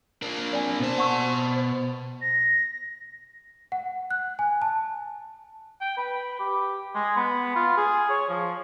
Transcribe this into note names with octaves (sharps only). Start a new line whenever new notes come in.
A#3 D4
C4 D5 G#5
B2 C5 A5
F#5 C#6 E6
A#6
F#5
F#6
G#5
A5
G5
B4
G4
G#3
B3
F4
G#4
C#5
F3